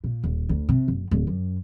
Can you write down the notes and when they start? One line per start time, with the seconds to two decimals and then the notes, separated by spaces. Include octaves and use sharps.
0.04 A#2
0.24 D#1
0.49 D2
0.69 C3
0.88 F#1
1.11 D1
1.27 F#2